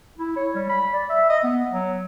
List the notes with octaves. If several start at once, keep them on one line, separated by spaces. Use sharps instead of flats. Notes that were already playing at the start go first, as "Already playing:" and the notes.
E4
C#5
G3
B5
D5
E5
D#5
B3
F#3